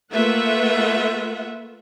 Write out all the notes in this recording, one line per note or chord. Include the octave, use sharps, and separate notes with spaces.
A3 A#3 F4 B4 E5 F#5